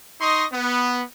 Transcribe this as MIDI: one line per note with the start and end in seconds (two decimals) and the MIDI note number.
0.21 0.46 63
0.21 0.46 75
0.21 0.46 84
0.21 0.46 85
0.21 0.46 87
0.52 1.02 59